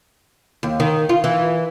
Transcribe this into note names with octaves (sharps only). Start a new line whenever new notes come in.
D#2
D#3
F4
E3